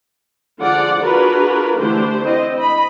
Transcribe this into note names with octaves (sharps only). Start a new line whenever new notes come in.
D3 F3 F4 G#4 D5 F#5
D4 F4 F#4 G#4 A#4 B4
D3 E3 A3 D4 G4 C5
C4 E4 C5 D#5
D#5 B5